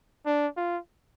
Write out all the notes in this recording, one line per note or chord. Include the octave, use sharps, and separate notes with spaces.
D4
F4